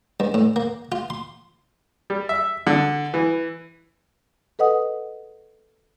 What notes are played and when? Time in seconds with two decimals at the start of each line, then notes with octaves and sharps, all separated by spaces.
0.20 G2
0.34 A2
0.56 A#3
0.92 F4
1.10 C6
2.10 G3
2.29 E5
2.67 D3
3.14 E3
4.59 A4 B4 D#5 F#5 D#6